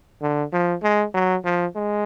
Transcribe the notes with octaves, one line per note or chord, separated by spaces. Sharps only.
D3
F3
G#3
F#3
F3
G#3